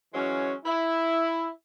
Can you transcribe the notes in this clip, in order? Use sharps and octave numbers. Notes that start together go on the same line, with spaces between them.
E3 F#3 G#3 C#4
E4